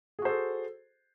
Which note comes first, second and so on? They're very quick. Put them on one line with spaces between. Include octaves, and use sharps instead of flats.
G#4 F#4 C5 A4